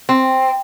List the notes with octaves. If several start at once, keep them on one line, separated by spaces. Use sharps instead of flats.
C4